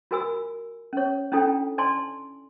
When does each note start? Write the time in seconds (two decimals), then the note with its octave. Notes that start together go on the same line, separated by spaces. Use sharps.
0.11 F4 F#4 A#4 G#5 B5 E6
0.93 C#4 C#5
1.32 C#4 D4 E4 F4 A4 G5
1.78 D5 G#5 A5 C6